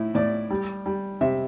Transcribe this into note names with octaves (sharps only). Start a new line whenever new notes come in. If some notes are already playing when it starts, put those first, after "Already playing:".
Already playing: A2 E4
A2 D5
G3
G3
C3 E5